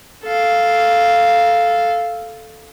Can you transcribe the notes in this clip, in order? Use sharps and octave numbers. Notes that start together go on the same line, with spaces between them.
A4 F5